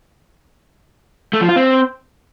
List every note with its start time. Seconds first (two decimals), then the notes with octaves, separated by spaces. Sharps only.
1.33 A3
1.41 F3
1.49 F4
1.56 C4